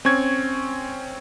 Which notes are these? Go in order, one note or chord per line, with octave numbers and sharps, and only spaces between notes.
C4 C#4 C#6 G#6